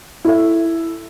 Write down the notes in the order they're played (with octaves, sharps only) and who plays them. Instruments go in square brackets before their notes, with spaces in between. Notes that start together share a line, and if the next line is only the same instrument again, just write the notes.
[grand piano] E4 A4 E5